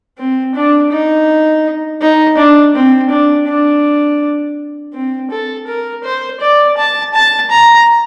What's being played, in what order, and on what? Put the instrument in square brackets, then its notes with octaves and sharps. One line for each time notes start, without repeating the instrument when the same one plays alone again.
[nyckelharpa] C4
D4
D#4
D#4
D4
C4
D4
D4
C4
A4
A#4
C5
D5
A5
A5
A#5